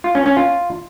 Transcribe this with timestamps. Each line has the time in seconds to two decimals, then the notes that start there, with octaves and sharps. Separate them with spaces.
0.04 F4
0.15 C#4
0.26 C#4
0.37 F4